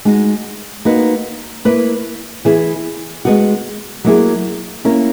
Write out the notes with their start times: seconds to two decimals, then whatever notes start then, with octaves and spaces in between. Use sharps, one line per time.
0.05 G#3 D#4 F#4
0.85 A#3 D#4 F#4 B4
1.65 A#3 E4 B4
2.45 E3 B3 E4 G#4
3.25 G#3 B3 F#4
4.04 F#3 A#3 E4 G#4
4.85 A#3 C#4 E4 A#4